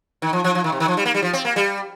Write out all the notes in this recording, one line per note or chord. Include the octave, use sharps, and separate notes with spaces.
D#3
F3
F3
F3
D#3
C3
D#3
F3
G3
A#3
G3
F3
C4
A#3
G3